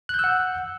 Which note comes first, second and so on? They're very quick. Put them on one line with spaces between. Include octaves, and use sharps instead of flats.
F#6 G6 E6 F#5